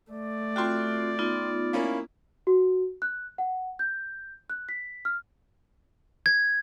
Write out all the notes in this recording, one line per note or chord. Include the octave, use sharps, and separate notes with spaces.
A3 D5
C4 F4 F#4 G5 C6
B3 D#4 F4
A#3 C#4 E4
F#4
F#6
F#5
G6
F#6
B6
F6
G#6